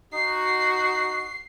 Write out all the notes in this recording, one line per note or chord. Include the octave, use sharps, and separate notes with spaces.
D#4 F#4 C7